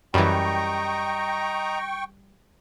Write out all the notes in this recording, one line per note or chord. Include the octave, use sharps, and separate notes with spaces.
F#2 E3 G3 D#5 G5 A#5 C#6